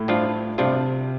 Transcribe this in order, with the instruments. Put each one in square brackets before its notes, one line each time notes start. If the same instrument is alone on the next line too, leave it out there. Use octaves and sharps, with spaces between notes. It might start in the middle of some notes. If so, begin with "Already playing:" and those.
Already playing: [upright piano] A2
[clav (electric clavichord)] G2 F3 D4 F4
[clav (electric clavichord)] G2 F3 D4 F4 [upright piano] C3